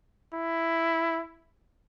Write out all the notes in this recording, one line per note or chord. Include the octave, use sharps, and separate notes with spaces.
E4